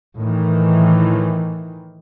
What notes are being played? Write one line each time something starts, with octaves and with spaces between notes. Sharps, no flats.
A2 D#3 E3